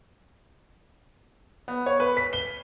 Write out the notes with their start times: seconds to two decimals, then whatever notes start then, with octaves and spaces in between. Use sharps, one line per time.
1.68 B3
1.86 C#5
2.00 B4
2.17 B6
2.33 G7